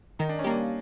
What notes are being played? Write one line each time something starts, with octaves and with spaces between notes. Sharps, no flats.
D#3 D#4
D4
C#4
G3 A#3 D4